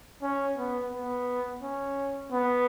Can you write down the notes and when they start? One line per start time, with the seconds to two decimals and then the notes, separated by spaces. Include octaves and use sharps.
0.23 C#4
0.57 B3
0.93 B3
1.63 C#4
2.32 B3